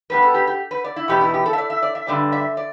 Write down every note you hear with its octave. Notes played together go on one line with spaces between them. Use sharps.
G2 G3 B3 B4
A4
G4
G4
B4
D5
E4
E2 B2 B3 G4
E4
G4
A4
E5
D5
E5
D5
E5
G2 D3 G3 D5
E5
D5